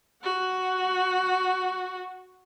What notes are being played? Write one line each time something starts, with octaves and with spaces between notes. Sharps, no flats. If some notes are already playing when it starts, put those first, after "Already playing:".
F#4 F#5